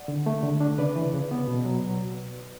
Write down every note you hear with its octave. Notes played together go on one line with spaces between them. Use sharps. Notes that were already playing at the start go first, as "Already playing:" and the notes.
Already playing: D5 F#5
D3
A3
D3
D4
C#3 B4 D5
E3
C#3
B3
B2
F#3